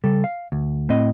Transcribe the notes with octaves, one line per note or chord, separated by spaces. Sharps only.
C#3 G3 A4
F5
D2
A2 C4 D#5